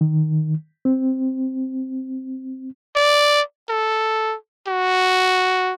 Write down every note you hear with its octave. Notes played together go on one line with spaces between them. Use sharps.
D#3
C4
D5
A4
F#4